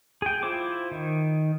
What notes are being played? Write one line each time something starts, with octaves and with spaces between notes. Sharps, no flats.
G#4 G5
E4 F4 C5 D6
D#3